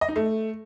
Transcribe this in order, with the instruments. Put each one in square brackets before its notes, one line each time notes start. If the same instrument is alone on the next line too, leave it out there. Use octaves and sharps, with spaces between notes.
[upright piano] D#5
D#4
A3